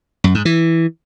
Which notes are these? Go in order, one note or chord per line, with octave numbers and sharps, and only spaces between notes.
F#2
G#2
E3